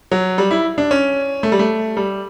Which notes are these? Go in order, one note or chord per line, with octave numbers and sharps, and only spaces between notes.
F#3
G3
E4
D4
C#4
A3
G3
A3
G3